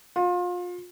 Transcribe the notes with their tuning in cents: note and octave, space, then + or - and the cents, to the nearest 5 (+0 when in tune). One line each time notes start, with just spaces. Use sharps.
F4 +30